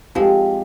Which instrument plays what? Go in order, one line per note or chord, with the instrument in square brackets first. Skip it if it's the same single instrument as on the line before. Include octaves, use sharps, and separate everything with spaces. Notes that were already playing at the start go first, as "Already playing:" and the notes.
[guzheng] F3 G#3 C4 [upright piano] G4